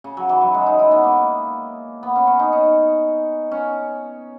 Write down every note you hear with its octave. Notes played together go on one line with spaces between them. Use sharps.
C#3
F#3
E3
F#3
G#3
D#4
E4
B3
A#3
B3
C#4
C#4
D#4
C#4
C#4